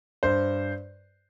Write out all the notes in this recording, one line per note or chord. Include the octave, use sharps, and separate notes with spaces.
G2 C5